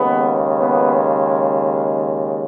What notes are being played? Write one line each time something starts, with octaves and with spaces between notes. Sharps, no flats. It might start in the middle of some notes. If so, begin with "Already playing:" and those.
Already playing: D#2 C#3 G#3 B3
B3